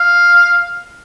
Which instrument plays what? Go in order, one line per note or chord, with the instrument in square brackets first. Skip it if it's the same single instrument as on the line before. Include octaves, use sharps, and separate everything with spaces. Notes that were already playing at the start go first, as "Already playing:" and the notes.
Already playing: [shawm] F5